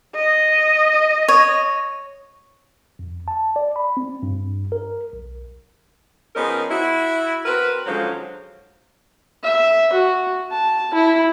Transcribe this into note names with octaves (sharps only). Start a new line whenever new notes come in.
D#5
C#5
F2
A5
D5
B5
C4
G2
A#4
B1
F3 B3 C#4 D#4 G#4 A#4
E4 F#4
C4 F#4 A#4 B4
G#2 D3 F3 F#3 G#3 C#4
E5
F#4
A5
E4